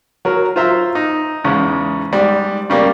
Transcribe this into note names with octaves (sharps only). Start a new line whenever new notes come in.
F#3 A#4
F4 C5 E5 A#5 E6
D#4
E2 G#2 C#3
G#2 G3
C#3 G3 A#3